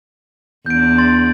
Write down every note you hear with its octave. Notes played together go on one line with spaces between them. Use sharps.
E2 D4 G6 D7
C6 A6